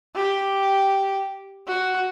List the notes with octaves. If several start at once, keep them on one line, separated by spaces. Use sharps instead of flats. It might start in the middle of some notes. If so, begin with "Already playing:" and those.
G4
F#4